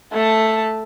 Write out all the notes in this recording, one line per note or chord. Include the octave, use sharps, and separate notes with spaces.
A3 A5